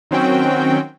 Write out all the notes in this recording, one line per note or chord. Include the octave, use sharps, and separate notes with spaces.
D#3 F#3 C4 C#4 F#4 G5